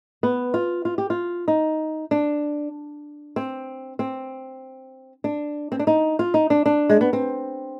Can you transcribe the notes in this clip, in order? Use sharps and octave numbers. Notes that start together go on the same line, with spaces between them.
B3
F4
F4
G4
F4
D#4
D4
C4
C4
D4
C4
D4
D#4
F4
D#4
D4
D4
G#3
B3
C4